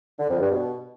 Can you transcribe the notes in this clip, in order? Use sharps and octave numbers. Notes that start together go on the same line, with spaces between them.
D3
F2
G2
B2